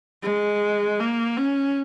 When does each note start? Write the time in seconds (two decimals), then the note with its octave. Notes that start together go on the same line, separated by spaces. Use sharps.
0.23 G#3
1.00 A#3
1.37 C#4